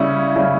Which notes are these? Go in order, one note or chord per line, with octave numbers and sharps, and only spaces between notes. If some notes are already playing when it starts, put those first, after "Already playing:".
Already playing: C#3 G3 C#4 E4
C#3 G3 C#4 E4